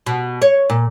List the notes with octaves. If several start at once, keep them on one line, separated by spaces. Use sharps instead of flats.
B2
C#5
A#2